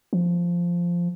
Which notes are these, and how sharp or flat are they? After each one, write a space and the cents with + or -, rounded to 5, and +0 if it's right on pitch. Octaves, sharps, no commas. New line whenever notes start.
F3 -5